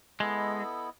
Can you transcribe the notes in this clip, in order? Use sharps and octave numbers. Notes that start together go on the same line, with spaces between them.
G#3 B3 E4 A4 D#5